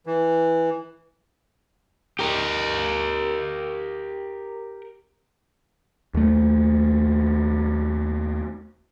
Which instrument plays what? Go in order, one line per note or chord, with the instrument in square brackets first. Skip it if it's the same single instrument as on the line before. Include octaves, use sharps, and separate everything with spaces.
[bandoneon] E3
[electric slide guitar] G4 A#4
[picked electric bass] D#2 A3